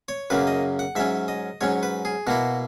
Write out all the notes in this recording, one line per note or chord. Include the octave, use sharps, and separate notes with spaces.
C#5
F#2 C#3 F#3 A#3 B4
D#5
F#5
G#2 F#3 C#4 E5
D#5
G#2 F#3 C#4 C#5
B4
G#4
B2 A#3 E4 F#4